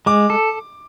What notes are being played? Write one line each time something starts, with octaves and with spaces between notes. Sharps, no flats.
G#3 D6
A4